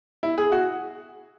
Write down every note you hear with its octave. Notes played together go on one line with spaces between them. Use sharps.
E4
G#4
F#4